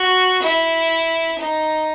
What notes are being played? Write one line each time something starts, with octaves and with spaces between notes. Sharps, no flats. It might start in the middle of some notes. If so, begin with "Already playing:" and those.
Already playing: F#4
E4
D#4